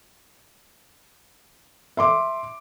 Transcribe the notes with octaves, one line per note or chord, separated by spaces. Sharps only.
E5 C6 D6